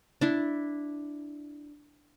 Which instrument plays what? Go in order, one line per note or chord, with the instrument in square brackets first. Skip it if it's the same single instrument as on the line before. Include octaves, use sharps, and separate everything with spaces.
[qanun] D4 E4